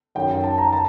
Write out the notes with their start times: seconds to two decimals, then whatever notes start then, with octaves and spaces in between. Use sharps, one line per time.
0.15 F#2 D#3 F#3 G5
0.44 A5
0.58 A#5
0.73 A5